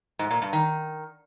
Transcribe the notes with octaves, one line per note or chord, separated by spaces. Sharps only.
G#2
A#2
G2
D#3